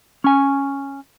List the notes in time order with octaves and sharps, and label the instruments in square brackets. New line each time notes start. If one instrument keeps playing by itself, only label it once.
[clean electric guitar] C#4 G#5